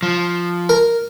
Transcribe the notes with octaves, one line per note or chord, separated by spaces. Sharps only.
F3
A#4